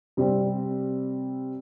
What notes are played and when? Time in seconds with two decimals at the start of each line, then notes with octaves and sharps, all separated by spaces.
0.17 C3 G3 C4